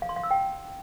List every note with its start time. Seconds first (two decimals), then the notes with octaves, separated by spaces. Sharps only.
0.02 F5
0.09 C6
0.16 F5
0.23 E6
0.31 G5